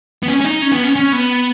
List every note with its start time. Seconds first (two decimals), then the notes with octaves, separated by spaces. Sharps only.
0.23 B3
0.28 C#4
0.41 C#4
0.45 D#4
0.62 C#4
0.72 B3
0.84 C#4
0.96 C#4
1.12 B3